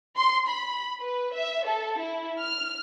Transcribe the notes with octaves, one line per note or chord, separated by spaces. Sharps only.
C6
B5
B4
E5
A4
E4
F6